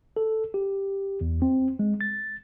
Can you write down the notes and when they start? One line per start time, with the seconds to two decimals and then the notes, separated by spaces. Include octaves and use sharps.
0.17 A4
0.54 G4
1.21 E2
1.42 C4
1.79 G#3
2.01 A6